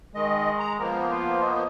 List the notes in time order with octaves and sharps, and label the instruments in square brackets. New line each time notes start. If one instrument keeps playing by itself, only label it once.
[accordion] D#3 D#5 [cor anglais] G#3
[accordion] A#5
[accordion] F3 A#3 B3 [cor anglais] A#4
[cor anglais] F4
D#5